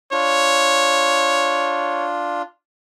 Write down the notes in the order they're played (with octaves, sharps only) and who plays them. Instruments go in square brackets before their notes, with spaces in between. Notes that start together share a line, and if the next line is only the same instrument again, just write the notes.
[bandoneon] D4 F4 [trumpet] C#5